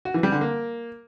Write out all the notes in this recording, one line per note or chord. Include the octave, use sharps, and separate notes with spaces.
F#4
E3
G3
D3
A#3